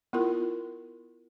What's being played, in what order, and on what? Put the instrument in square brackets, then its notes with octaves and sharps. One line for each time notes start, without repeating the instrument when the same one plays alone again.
[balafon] B3 E4 F4 A#4